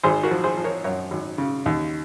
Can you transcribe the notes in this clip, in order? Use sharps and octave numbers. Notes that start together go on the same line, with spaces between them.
G#1 G#4 C5
F#4 A#4
F3
G#4 C5
F3
A#4 C#5
F#2 A#4 C#5
G#1
C#3
D#2